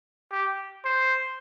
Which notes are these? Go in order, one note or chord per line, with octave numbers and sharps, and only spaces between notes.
G4
C5